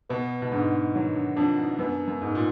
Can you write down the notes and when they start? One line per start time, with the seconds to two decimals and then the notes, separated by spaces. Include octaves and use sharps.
0.09 B2 B3
0.42 B2
0.52 G#2 D3
0.95 D#3 F#3
1.16 D3
1.36 F2 D4
1.58 G#2
1.79 F#2 B3
2.08 F#2
2.22 G#2
2.35 A#2